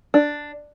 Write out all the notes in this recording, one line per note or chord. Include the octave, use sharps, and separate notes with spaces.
D4